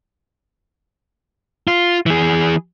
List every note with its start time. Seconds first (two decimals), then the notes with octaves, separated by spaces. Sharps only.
1.68 F4
2.06 E3 G#4